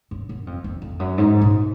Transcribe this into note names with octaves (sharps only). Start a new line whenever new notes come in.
F#2
F#2
F2
F2
F2
F#2
G#2
A#2